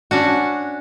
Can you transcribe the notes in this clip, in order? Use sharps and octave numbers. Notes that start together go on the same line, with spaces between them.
C#4 D4 F#4